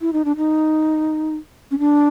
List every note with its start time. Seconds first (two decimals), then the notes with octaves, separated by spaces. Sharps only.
0.01 E4
0.13 D#4
0.25 D4
0.36 D#4
1.71 C#4
1.79 D4